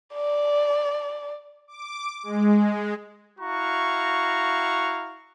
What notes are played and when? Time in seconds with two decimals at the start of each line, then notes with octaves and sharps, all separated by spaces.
0.14 D5
1.68 D6
2.23 G#3
3.40 E4 F#4 F5 A#5 C#6